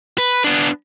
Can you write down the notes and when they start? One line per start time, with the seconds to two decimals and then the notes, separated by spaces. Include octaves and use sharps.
0.18 B4
0.44 B3 D4